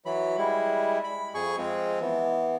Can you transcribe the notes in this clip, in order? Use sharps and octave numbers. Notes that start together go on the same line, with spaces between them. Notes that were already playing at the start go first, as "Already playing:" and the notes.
E3 F#3 B5
G3 G#3 E4
B5
F2 G#4 G#5 C#6
F3 G#3 C4
E3 B3